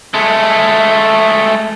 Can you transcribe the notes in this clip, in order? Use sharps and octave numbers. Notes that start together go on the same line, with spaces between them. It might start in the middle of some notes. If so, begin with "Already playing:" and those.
G#3 A3